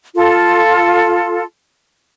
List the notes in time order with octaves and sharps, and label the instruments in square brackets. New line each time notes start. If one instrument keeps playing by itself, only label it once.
[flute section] F4 A4